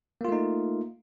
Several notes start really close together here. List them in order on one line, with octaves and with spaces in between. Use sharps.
A#3 F4 A3 D#4